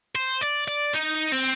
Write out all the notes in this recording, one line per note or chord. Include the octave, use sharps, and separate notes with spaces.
C5
D5
D5
D#4
C4